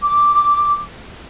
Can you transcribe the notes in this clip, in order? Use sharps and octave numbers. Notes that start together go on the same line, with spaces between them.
D6